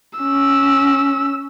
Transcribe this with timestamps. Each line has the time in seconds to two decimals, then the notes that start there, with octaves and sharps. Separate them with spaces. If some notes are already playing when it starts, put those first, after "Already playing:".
0.19 C#4 E6